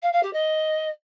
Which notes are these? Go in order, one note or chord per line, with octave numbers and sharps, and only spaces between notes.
F5
F5
G4
D#5